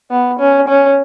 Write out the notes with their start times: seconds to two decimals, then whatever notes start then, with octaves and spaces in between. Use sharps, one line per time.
0.11 B3
0.40 C#4
0.68 C#4